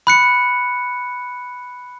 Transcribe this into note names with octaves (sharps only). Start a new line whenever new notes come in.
B5 F#6 C#7